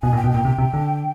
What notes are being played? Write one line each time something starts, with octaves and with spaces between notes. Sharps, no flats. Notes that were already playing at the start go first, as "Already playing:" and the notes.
B2 G#5
A#2
G5
B2
A#2 G5
C3
C3
D3